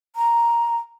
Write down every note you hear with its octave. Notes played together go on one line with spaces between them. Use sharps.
A#5